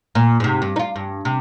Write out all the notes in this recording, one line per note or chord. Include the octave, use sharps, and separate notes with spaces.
A#2
G#2 C3
G2
D#4 F4
G2
C3